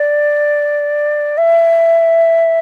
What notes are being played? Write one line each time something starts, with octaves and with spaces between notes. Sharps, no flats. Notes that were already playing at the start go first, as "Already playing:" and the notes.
Already playing: D5
E5